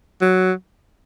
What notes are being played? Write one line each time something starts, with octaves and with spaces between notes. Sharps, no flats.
F#3